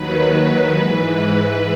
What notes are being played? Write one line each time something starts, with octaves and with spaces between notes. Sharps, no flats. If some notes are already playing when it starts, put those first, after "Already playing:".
Already playing: D#2 D#3 F#3 B4
G#2 E3 B4